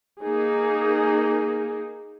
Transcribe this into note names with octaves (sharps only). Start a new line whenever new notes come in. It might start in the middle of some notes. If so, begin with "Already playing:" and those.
A#3 D#4 G#4